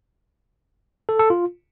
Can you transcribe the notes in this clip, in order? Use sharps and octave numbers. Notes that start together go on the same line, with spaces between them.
A4
A4
F4